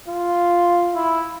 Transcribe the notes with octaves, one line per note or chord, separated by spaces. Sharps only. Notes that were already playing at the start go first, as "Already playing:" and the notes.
F4
E4